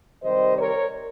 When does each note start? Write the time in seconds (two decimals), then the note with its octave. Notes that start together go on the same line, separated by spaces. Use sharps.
0.23 C3 D#3 G3 C5 D#5
0.56 A#4 C#5